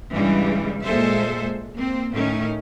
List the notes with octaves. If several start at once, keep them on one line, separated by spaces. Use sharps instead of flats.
G2 C#3 E3 G3 G#3
A#2 G#3 A4 C5 E5
A#3 C4
A2 D#3 A3 C#4